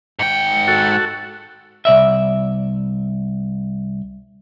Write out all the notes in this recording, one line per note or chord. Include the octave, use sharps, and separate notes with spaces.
G#2 G5 C#7
F#4 A4
C2 D5 E5